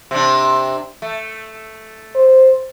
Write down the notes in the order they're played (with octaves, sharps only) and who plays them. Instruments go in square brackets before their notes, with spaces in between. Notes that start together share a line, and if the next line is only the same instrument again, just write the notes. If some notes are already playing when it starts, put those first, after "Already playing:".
[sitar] C3 D4
A3
[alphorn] C5